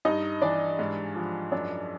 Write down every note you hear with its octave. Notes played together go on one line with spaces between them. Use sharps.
G2 D#4 D#5
E3 D4 D5
G#2
F3
F#2 D4 D5